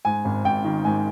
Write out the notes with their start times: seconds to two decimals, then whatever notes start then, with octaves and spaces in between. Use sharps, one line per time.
0.05 G#2 G#5
0.25 G#1
0.44 G#1 G5
0.64 D#3
0.85 G#2 G#5